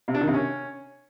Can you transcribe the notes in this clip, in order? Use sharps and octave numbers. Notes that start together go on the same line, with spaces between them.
C3
D4
D#3
C3
C#4